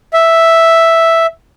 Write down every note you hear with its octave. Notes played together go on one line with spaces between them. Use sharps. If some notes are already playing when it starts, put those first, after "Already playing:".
E5